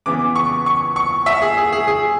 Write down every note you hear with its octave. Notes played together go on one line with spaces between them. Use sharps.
C#3 E3 B3 D6
C#6
C#6
C#6
E5
G#4
G#4
G#4
G#4